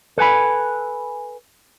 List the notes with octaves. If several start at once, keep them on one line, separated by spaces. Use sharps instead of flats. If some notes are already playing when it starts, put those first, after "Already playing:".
A4 B4 G#5 B5